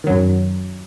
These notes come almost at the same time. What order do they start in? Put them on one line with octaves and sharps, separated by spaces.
D#3 F#3 F#2